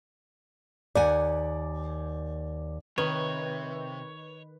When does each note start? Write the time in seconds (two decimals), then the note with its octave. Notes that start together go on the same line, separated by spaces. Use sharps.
0.95 D#2 D5 F#5 G#5
2.98 C3 D#3 B4 C#5